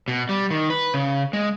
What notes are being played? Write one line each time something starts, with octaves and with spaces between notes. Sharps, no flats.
B2
G3
D#3
B4
C#3
G#3